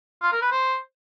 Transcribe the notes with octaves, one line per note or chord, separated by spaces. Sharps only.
F4
A#4
B4
C5